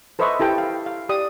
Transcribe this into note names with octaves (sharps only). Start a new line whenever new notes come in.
A4 B4 C5 D#5 E5 C#6
E4 G4 A4 G5
F5
F5
G4 D5 D#6